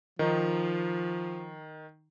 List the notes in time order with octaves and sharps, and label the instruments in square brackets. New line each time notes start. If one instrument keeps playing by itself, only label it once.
[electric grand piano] D#3 D#4 [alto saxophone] F3